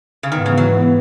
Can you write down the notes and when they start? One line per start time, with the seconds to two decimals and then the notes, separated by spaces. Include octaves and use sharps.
0.23 C#3
0.32 G#2 D#3 E3 B3
0.46 C#3
0.58 F#3